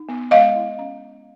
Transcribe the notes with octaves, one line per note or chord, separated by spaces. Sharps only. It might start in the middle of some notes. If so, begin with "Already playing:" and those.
Already playing: D#4
B3
G#3 D#5 F5
E4
C#4